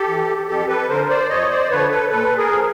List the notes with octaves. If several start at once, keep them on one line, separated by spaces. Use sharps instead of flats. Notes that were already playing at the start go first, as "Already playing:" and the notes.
Already playing: G4 A4
E3
F2 G4 A4
A4 B4
D3 F3 A#4 C5
C5 D5
F2 C#5 D#5
C5 D5
D3 F3 B4 C#5
A4 B4
A#2 A4 B4
G#4 A#4
F3